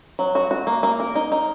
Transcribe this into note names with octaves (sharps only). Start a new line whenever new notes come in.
F#3
F#4
F#4
A#3
A#3
A#4
D#4
D#4